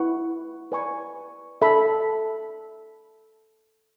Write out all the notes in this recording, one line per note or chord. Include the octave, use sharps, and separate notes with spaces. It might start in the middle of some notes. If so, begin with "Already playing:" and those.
Already playing: E4 B4 F#5 C#6
B4 D5 G#5 C#6
A4 E5 B5